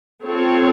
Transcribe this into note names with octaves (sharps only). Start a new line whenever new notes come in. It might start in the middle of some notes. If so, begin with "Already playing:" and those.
C4 F4 A4 C#5